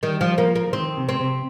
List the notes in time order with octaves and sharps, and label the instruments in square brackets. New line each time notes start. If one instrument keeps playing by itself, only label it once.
[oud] D#3 [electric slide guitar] G3
[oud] F3
[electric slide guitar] F3 [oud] A#3
[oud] A#3
[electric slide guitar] F3
[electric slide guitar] D#3 [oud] C4
[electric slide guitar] C3
[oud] C4
[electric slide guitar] C3